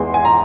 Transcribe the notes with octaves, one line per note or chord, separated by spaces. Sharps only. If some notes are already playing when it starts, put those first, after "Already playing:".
Already playing: E2 E3 G#3 C6
G#5
A#5